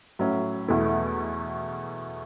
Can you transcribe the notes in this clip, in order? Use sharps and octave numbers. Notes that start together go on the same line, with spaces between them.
A2 F#3 C#4
E2 B2 A3 E4